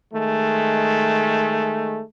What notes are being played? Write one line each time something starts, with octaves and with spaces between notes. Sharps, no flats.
D#3 G#3 A3